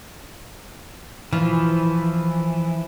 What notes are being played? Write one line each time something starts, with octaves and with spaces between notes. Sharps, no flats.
E3 F3